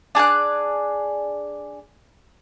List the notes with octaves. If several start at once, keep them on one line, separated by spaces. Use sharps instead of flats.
D4 G#4 D5 F#6